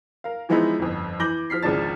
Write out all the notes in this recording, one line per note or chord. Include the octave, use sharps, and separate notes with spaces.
A#4 F5
E3 F3 G#3 B3 D#4 E4
G1 F2
E3 D6 G6 A#6 F#7 G7
F3 F6 B6 C7
G#1 C#2 F3 D4 A5 A6